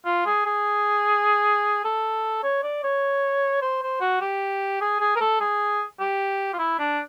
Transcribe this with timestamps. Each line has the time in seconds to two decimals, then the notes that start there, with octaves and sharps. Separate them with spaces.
0.06 F4
0.26 G#4
0.46 G#4
1.84 A4
2.43 C#5
2.63 D5
2.83 C#5
3.62 C5
3.82 C5
4.01 F#4
4.21 G4
4.81 G#4
5.00 G#4
5.16 A#4
5.21 A4
5.40 G#4
6.00 G4
6.53 F4
6.59 E4
6.79 D4